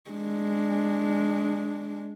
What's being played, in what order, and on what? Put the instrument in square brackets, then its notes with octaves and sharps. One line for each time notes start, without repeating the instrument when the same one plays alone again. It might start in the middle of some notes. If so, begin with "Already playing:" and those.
[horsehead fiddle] G#3 D4